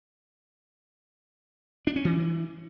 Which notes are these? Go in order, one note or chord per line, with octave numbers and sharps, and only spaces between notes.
D4
C#4
E3